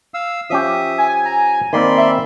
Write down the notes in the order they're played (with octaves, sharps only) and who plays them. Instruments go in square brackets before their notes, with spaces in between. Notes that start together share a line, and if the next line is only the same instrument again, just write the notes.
[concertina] F5 E6
[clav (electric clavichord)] F3 C#4 G4 [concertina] E5 D#6
[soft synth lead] G#5
[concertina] A#5
[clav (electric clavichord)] D#3 A#3 C4 [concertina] D5 B5 C6
[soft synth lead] E5